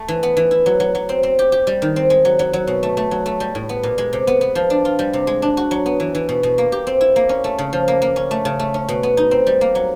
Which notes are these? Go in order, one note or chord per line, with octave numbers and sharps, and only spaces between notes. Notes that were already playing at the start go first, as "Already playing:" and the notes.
Already playing: A3
E3
B3
E3
E4
F#3
F#3
F#3
C4
C4
G4
G4
G3
D#3
C4
G#3
F#3
F#3
F#3
B2
A3
A3
F#3
A3
G3
A2
B3
A#2
G#3
C3
B3
B3
F3
D4
F4
G3
C3
G#3
D4
F#4
F#3
B3
E3
E3
B2
B2
A#3
G4
C4
E4
A#3
C#4
A3
C#3
F3
A#3
A#3
C#4
A3
C#3
A3
C#4
B2
B3
D#4
C4
G3
A#3
F#3